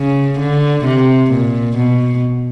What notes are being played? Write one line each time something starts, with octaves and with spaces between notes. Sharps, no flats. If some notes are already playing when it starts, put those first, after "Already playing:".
Already playing: C#3
D3
C3
A#2
B2